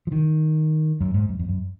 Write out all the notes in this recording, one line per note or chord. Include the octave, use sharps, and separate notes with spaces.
F3
D#3
F#2
G#2
F#2
F2
F#2